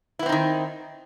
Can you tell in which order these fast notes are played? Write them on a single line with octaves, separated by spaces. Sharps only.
E4 B3 C4 D#4 D#3